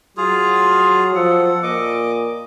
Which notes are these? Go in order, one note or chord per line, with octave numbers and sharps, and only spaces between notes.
F#3 F4 G#4
F3 A4 F#5
A#2 D#5 D6